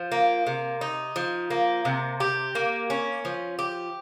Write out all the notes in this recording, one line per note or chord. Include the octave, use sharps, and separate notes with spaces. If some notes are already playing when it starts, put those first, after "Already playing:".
Already playing: F3
A#3
C3
D#4
F3
A#3
C3
G4
A#3
C#4
F3
G4